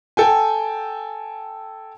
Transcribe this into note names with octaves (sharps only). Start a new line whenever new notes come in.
A4 G5 G#5